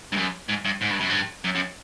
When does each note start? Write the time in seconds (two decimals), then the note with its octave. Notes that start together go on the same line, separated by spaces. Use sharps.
0.12 G2
0.17 F#2
0.49 G#2
0.65 G2
0.81 G#2
0.90 G2
1.00 F#2
1.10 G2
1.44 F#2
1.55 F#2